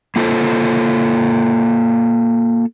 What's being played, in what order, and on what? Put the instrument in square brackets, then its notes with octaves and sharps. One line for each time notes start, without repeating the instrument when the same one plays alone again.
[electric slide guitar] A#3 F4 A4 C5